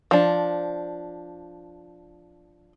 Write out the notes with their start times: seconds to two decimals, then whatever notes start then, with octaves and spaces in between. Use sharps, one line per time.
0.11 F3 D4